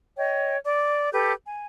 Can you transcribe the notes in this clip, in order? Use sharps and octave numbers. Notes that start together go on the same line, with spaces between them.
C#5 D#5 G5
D5 D6
G4 A4 B4 G6
G#5